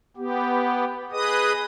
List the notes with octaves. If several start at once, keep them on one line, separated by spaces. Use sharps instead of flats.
B3 G4
G#4 B4 D#5 D#6